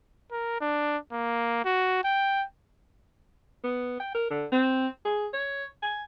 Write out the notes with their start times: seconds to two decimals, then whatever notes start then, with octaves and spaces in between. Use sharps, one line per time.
0.31 A#4
0.61 D4
1.12 A#3
1.65 F#4
2.04 G5
3.64 B3
4.00 G5
4.14 A#4
4.30 D3
4.52 C4
5.05 G#4
5.33 C#5
5.82 G#5